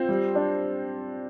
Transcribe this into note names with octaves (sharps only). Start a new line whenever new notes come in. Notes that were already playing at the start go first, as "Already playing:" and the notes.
Already playing: C4 F4 C5
G3
D4